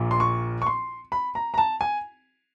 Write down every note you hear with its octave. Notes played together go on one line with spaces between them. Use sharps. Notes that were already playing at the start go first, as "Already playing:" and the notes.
Already playing: A#1 A#2 F3
C6
C#6
C#6
C6
B5
A#5
A#5
A5
G#5